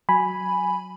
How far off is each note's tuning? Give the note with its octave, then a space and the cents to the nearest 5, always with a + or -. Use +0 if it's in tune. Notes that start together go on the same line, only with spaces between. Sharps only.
F#3 +0 G#5 +0 B5 +0